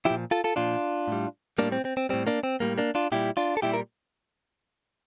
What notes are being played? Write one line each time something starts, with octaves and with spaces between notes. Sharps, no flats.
F3 E4 G4
A#2
F4 A4
F4 A4
A#2 F3 D4 F4
A2 G3
A2 G3 A#3 D4
C4
C4
C4
A2 G3 C4
A#3 D4
C4
A2 G3 A#3
A#3 D4
D4 F4
A#2 G3 E4 G4
D4 F4
A4
A#2 G3 E4 G4
A#4